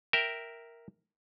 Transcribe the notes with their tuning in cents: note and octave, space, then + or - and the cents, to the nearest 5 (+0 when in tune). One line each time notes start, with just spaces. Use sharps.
A#4 +0 E5 +0 G5 +0